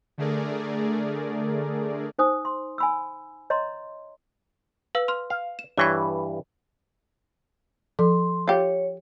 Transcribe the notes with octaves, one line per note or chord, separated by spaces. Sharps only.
D3 A3 G#4 A#4 D5
D#4 C5 G#5 D#6
C6
G#5 B5 E6
C#5 D#5 A#5 C6
B4 F5 E6
C6 F6
F5
E7
G2 E3 C#5 C#6 G#6
F3 A4 C6
F4 G4 C#5